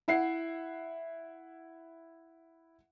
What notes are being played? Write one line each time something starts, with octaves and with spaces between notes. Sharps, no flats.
E4 E5 F#5 C7